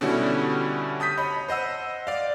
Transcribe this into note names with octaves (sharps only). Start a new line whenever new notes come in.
B2 D3 G3 C#4 E4 F#4
A5 D#6 G6 B6
C#5 D#5 B5
C5 D#5 F#5 E6
D5 F5